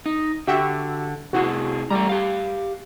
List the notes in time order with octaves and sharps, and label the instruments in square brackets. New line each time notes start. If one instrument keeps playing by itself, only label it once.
[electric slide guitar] D#4
[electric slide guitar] D3 [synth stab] F#4 G4 E5
[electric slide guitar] C3 E4 G#4 [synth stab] F#4
[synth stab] G3 [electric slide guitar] A3 A#5
[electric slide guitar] G4 F5